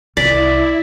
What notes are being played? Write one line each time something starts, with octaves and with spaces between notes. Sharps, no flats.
C2 E4 D5 A6 B6